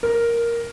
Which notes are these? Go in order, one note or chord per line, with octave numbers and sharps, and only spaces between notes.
A#4